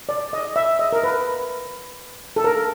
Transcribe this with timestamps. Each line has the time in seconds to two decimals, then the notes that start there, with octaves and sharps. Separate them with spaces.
0.09 D5
0.33 D#5
0.56 E5
0.79 D#5
0.93 A#4
1.03 B4
2.36 A4
2.44 A#4